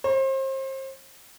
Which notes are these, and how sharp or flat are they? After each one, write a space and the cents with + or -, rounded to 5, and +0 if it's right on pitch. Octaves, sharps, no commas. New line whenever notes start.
C5 +35